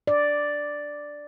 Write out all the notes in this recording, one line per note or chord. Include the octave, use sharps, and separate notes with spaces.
D5